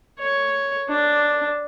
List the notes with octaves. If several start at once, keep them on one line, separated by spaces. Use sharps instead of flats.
C#5
D4